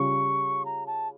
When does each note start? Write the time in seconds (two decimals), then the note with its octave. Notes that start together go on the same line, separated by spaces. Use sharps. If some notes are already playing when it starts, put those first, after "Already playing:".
Already playing: C#3 G3 C#4 F4 C#6
0.65 A#5
0.87 A5